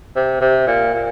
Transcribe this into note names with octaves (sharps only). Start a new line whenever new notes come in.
C3
C3
A#2
A#2